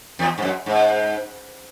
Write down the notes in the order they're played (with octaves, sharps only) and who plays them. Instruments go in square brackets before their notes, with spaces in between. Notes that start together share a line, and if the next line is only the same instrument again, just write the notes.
[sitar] E2
G#2
F#2
G#2